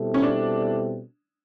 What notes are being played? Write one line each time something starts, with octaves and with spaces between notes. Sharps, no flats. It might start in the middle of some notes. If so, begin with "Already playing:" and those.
Already playing: B2 G3 C4 E4 A4
C#4
D4